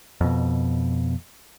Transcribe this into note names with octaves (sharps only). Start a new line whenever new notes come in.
F2 B2